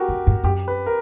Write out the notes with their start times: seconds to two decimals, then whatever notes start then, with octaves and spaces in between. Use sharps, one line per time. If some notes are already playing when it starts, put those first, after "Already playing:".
Already playing: F#4 G4 A#4
0.09 F#2
0.27 G2
0.44 F#2 G4
0.68 B4
0.86 A#4